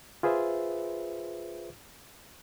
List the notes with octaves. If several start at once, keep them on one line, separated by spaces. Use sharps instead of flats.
F4 G#4 B4 C5 E5